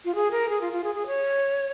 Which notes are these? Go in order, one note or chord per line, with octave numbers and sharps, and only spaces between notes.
F4
G#4
A#4
G#4
F4
F4
G#4
G#4
C#5